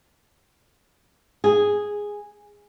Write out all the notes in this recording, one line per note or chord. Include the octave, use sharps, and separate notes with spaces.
G#4